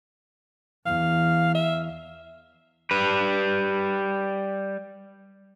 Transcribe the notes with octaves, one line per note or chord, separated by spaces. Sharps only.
E2 F5
E5
G3 B4